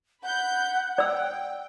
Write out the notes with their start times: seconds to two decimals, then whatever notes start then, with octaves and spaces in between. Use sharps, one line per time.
0.23 F#5 B5 G6
0.98 D5 G5 E6